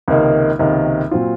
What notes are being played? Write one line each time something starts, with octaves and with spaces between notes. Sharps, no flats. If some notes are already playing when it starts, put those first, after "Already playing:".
C#2 C3 D#3 A#3 D#4
C#2 C3 D#3 A#3 D#4
A#2 F#3 C4 F4